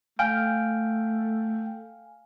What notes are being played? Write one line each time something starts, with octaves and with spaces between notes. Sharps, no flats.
A3 F5 G5 G#5 F6